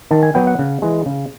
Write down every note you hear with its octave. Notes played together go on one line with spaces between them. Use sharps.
D#3 A5
G#5
F#3 B3 G5
F#5
C#3
E3 G#3
C#3